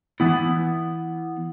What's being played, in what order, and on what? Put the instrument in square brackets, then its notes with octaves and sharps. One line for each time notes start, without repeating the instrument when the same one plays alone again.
[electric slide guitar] E3 B3 E4